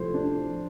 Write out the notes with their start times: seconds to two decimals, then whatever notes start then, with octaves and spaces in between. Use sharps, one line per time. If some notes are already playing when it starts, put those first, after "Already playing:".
Already playing: C3 F3 A3 E4 C5
0.14 D4